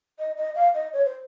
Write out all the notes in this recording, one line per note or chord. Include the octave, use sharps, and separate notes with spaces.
D#5
D#5
F5
D#5
C#5
C5